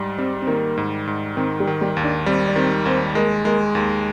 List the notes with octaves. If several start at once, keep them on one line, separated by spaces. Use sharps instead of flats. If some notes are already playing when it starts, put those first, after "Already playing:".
Already playing: G#2 G3
G3 C4
C4
D#3 A#3
G#2
G#2
D#3 C4
G3 G4
D#3
G3 G4
D#2
D4 D5
G3 C4 C5
D5
D#3 C4 C5
D#2 C4 C5
G#3 A#3 A#4
G#3 A#3 A#4
D#2 A#3 A#4